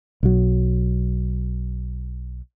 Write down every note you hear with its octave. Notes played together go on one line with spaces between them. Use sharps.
B1 F#3